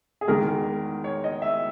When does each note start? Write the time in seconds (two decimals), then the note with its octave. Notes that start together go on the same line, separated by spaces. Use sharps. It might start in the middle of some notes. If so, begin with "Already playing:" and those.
0.21 G#4
0.28 E2 D#3 G#3 A#4
1.04 C#5
1.24 D#5
1.42 E5